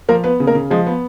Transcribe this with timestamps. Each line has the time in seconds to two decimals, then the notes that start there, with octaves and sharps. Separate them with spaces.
0.09 F3 A#3 A#4
0.24 B3 B4
0.40 C#3
0.47 A#3 A#4
0.55 C#3
0.71 F3 G#3 G#4
0.86 B3